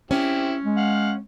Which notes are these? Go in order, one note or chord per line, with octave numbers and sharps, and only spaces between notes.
C4 C#4 E4 G4
G#3
F5 F#5